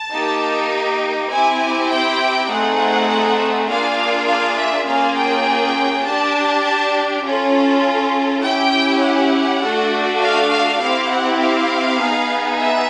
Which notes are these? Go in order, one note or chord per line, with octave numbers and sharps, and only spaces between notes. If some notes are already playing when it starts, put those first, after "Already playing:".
Already playing: A5
A#3 D#4 G4
C4 E4 G4 G#5
G5
A3 C4 D#4 G#4 F#5
A#3 D4 F4 G#4 F5
F5
E5
A#3 C#4 F4 G#4 F5
G5
D4 G4 A5
A5
C#4 F4 A4
C#4 E4 G4 G5
F#5
A3 D4 F#4 A4
F5
F5
C4 E4 G4 F5
F#5
F5
B3 D#4 G#4
E5